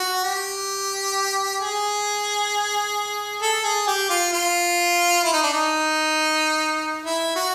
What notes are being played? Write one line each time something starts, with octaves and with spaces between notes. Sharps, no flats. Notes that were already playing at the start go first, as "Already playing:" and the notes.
Already playing: F#4
G4
G#4
A4
G#4
G4
F4
F4
E4
D#4
D4
D#4
E4
F#4